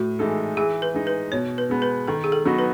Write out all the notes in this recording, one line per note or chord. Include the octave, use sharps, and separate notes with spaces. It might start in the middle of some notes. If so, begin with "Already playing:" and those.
Already playing: A2 F#4
E3 G#3 D#4 A4
E3 G#4
B4
G#3 D#4
B4
B2 C#5
B4
G#3 B3
B4
D#3 A4
G#4
A4
F#3 B3 D#4 F#4
B4